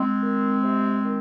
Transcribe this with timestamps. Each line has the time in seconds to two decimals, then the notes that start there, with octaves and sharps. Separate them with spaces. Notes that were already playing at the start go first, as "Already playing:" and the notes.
Already playing: G#3 C4
0.21 D#3
0.63 C3
1.05 D#3